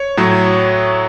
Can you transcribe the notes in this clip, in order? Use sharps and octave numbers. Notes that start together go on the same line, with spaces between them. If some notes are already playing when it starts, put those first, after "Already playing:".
Already playing: C#5
A2 F#3